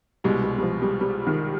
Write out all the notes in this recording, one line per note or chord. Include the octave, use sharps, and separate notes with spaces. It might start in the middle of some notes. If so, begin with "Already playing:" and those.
C2 B2 G3 G#3
G3
G3
F3
G3
G3
D#3